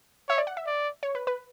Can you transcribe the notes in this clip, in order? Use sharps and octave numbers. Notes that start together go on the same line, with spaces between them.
C#5 E5
D5
F#5
E5
D5
C#5
B4
B4